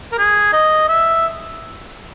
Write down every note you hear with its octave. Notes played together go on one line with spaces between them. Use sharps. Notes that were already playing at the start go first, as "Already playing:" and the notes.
A#4
G#4
D#5
E5